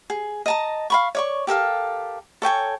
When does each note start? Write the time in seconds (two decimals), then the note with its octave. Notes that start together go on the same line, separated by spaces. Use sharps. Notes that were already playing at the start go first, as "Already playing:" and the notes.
0.10 G#4
0.46 D#5 A5 A#5
0.90 F5 B5 C#6
1.15 C#5 D5 C#6
1.47 G4 A4 A#4 F5
2.42 A4 C#5 G5 G#5